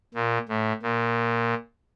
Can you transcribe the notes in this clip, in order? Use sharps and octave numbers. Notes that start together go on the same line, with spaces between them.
A#2
A2
A#2